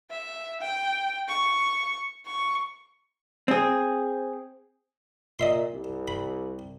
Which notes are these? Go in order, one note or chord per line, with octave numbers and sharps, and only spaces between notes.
E5
G5
C#6
C#6
C4 G#4
A#2 D#5 E5 C6
C2
B5